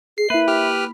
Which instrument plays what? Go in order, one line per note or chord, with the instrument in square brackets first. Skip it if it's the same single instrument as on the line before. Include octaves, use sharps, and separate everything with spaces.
[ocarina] G#4 [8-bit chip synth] C7
[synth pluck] A#3 E4 [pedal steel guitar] B4 [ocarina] E5
[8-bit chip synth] G4 F6
[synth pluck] B5